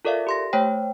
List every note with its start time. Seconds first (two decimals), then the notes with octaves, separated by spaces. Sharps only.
0.05 F4 A4 A#4 D5 E5 F5
0.27 G4 C6 A#6
0.53 A3 C5 C#5 G5